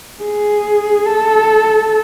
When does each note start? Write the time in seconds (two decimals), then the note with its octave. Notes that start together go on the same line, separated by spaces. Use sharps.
0.23 G#4
1.06 A4